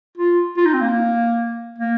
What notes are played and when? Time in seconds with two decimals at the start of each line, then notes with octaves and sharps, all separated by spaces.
0.17 F4
0.57 F4
0.66 D#4
0.74 C4
0.81 A#3
1.78 A#3